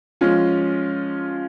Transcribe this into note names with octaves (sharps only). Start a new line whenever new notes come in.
F3 G#3 C#4 F4